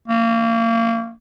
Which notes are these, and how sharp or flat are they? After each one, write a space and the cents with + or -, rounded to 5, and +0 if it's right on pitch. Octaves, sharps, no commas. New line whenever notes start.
A#3 -30